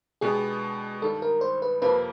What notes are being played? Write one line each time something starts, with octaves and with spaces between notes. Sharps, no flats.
B2 G#3 B3 D4 G4 G#4
G2 D#3 G3 A4
A#4
C5
B4
F2 C3 F3 A#3 B4